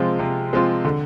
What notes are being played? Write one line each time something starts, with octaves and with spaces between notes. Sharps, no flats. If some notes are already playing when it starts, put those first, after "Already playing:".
Already playing: C3 F3 G#3 C4 F4
C3
F3 G#3 C4 F4
D3